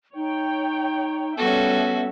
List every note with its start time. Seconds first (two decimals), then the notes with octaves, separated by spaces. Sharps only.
0.16 D#4 C#5 G5
1.38 G3 B3 C#4 F#4 A4 E5